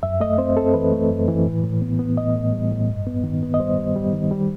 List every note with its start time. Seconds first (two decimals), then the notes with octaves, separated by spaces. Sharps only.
0.03 F#2 E5
0.20 A3 D#5
0.38 C4 C5
0.57 C4 A4
0.74 E3 B4
0.92 A3
1.10 F#2
1.28 E3
1.46 A2
1.64 A2
1.82 B3
1.99 B3
2.17 A2 D#5
2.35 A2
2.53 G3
2.71 A2
2.89 G2
3.07 B3
3.24 D#3
3.43 B3
3.54 D#5
3.59 G3 C5
3.78 G3
3.96 G3
4.13 D#3
4.31 G3